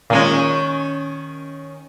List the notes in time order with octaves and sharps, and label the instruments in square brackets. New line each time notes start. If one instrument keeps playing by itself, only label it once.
[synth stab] A#2 G#3 [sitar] D#3 C#4